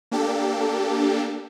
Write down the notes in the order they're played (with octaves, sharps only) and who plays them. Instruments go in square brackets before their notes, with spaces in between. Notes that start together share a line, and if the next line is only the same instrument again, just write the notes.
[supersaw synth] A#3 D4 G4 A4